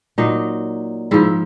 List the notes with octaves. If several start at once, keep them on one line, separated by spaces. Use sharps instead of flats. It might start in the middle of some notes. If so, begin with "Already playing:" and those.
A#2 F#3 D#4
G#2 F3 E4